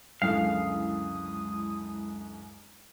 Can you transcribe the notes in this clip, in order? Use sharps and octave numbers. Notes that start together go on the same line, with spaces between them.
C#2 F#2 D3 G#3 E4 F5 D#6